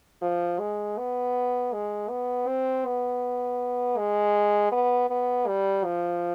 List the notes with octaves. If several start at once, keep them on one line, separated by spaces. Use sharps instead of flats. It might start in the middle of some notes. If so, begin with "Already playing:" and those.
F3
G#3
B3
G#3
B3
C4
B3
G#3
B3
B3
G3
F3